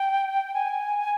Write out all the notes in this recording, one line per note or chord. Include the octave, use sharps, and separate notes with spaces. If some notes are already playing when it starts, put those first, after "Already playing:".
Already playing: G5
G#5